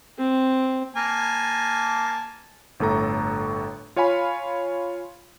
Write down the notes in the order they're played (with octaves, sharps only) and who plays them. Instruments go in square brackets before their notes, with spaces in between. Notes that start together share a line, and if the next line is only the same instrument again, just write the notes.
[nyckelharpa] C4
[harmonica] A#3 G#5 A5
[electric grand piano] G1 A2 A4 A#5
F4 C#5 F5 G#5 B5